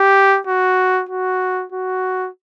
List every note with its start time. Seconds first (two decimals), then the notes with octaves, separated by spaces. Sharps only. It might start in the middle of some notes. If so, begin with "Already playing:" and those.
Already playing: G4
0.47 F#4
1.09 F#4
1.72 F#4